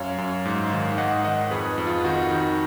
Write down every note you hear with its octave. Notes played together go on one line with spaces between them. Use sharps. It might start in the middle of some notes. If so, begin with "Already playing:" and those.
Already playing: F#2 C#5 F5
F#2
G#2
D#3
G#2 D#5 F#5
D#3 D#5 F#5
F2 G#4 B4
F2
F4
D#3 D#4 F#4
D#3